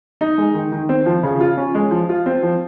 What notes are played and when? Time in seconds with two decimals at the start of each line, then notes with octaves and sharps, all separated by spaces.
0.21 D#4
0.38 G#3
0.54 D#3
0.72 D#3
0.89 C4
1.06 F3
1.23 C#3
1.40 F4
1.57 C#4
1.75 G#3
1.91 F3
2.09 F4
2.26 C4
2.43 F3